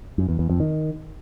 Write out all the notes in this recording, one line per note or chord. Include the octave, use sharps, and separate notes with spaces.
F#2
E2
E2
F2
D#3